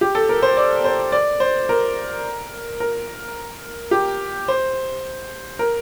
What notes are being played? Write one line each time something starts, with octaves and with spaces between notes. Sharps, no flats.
G4
A4
A#4
C5
D5
C5
D5
C5
A#4
A#4
G4
C5
A#4